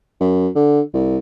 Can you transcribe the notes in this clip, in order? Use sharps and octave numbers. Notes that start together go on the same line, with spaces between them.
F#2
D3
C2